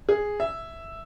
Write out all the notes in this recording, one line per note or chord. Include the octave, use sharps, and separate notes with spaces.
G#4
E5